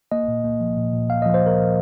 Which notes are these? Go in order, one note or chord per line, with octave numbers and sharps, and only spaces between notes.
A#3 D#5
A#2
A#3
F3
A#2
A#2
A#2 F5
D#5
F3
C5
F3 A#4
A#2